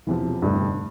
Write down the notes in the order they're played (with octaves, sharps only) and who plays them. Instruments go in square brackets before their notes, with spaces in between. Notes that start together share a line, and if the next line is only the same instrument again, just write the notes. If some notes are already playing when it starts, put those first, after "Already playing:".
[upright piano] E1 E2 C3 F3 [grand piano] E3
[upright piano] F1 E2 D3 A3 D4 [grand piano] G2